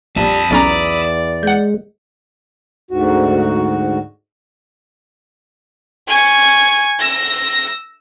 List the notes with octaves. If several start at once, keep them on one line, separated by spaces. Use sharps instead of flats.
A#1 F2 G3 A5 B5 D#6 E6
B1 E2 C#4 D5 A#5
G#3 F#5 G6
D2 G#2 F#4
G#5 C#6
E6 A#6